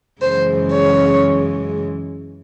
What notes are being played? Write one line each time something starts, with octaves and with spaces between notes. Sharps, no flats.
F#2 C#3 E3 G#3 C5
C#5